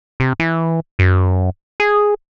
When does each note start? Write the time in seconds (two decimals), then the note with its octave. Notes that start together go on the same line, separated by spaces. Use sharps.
0.20 C3
0.40 E3
0.99 F#2
1.80 G#4